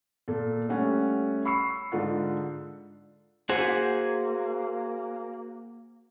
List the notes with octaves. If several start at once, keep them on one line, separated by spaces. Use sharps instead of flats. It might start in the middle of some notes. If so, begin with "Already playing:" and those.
A#2 A4
G3 A3 C#4 F#5
B5 C#6 E6 C7 C#7
G#2 D3 F4 A4 F#5
A#3 F#4 G#4 C5 F#5